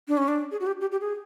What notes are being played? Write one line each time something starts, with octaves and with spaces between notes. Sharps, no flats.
D4
C#4
D4
G#4
F#4
G4
G4
G4
G#4